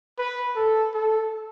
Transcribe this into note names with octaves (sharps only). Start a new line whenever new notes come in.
B4
A4
A4